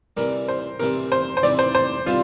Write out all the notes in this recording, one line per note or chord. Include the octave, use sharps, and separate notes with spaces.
C3 E3 G3 A#4
C5
C3 E3 G3 A#4
C5
C5
C3 E3 G3 D5
C5
C5
C3 E3 G3 F4